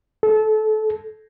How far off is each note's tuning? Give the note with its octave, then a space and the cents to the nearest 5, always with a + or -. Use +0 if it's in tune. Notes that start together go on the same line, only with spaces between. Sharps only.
A4 -25